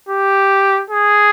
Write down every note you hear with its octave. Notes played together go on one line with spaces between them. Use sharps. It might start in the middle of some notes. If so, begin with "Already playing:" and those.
G4
G#4